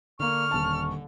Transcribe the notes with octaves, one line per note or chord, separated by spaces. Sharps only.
D3 A#3 D4 C#6 F6
D#1 A5